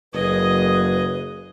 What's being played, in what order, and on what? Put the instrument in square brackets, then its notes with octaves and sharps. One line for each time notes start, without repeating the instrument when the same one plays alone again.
[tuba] F#1 [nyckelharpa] G#4 D#5 [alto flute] B4